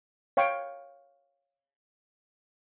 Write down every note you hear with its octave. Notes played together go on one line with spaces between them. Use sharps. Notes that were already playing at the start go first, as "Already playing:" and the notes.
C#5 F5 G5 C#6